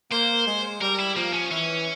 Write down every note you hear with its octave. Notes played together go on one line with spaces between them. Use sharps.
A#3 C5
G#3
G3 A#4
E4
F3 A#3
C#4
E3 C#4